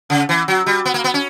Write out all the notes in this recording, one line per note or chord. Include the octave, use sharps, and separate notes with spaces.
C#3
E3
F#3
G3
B3
A#3
B3
C#4